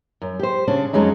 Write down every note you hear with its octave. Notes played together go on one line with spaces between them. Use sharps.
F#2
G4 C5
C#3 C#4 D4
F2 F#3 G#3 C#4 D#4